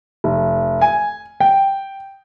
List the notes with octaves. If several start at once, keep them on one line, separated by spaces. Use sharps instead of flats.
F1
G#5
G5